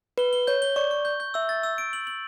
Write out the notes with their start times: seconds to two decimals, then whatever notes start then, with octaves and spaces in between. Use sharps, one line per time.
0.18 B4 G7
0.33 G7
0.47 C#5 G6
0.62 G7
0.76 D5 C#6
0.91 C#6
1.05 G6
1.20 G6
1.34 E5 E6
1.49 A6
1.63 E6
1.78 D7
1.93 F#7
2.07 F#7